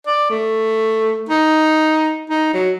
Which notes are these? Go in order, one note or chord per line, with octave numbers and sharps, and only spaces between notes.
D5
A3
D#4
D#4
F#3